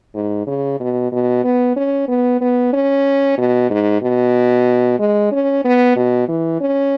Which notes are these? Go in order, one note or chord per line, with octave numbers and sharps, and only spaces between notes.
G#2
C#3
B2
B2
B3
C#4
B3
B3
C#4
B2
G#2
B2
G#3
C#4
B3
B2
E3
C#4